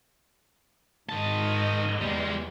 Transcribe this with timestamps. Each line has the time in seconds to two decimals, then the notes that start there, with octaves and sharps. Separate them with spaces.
1.09 G#2 D#3 D#5 A5
2.01 E2 G3 G#3